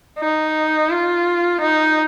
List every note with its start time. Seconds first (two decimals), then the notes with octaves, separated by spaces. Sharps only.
0.19 D#4
0.90 F4
1.61 D#4